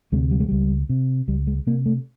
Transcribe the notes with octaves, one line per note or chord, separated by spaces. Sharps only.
D2 C3 G#3
G3
G#3
C#2 G3
C3
C#2 G3
G#3
C3 A#3
A3